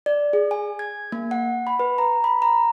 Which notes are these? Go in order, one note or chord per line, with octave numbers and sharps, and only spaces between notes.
D5
G#4
G#5
G#6
A#3
F#5
B5
B4
A#5
B5
A#5